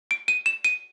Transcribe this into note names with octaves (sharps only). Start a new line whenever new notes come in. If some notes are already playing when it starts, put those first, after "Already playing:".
D7
D#7
E7
D#7